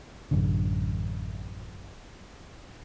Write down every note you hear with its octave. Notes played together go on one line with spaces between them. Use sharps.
A1 F#2 D3